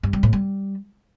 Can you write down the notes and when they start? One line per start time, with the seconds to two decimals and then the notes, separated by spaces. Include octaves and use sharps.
0.03 G2
0.13 G3
0.23 A2
0.33 G3